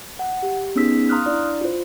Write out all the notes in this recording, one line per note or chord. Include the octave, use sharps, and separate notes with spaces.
F#5
G4
B3 C#4 D#4 G#4 E6 B6
F5 A#5 C6 D#6 F6 F#6
D4 E4 D5
F4 C5